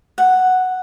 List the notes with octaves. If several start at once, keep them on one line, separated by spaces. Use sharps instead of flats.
F#5